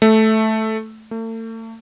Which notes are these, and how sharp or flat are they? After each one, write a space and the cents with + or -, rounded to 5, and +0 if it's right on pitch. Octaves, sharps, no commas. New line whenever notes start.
A3 -5
A3 +40